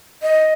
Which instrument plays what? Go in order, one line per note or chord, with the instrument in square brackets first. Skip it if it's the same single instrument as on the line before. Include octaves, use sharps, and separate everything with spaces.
[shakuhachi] D#5